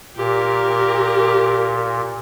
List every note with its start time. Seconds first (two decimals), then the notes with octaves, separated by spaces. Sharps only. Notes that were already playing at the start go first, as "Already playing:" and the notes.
0.16 A#2 G4 A#4